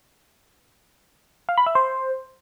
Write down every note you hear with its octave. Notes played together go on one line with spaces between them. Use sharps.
F5
B5
E5
C5